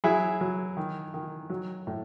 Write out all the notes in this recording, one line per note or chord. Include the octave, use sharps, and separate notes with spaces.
F#3 E4 G#4
F#3
D#3
D#3
F#3
A2